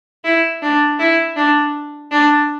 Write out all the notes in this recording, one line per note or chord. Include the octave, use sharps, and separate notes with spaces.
E4
D4
E4
D4
D4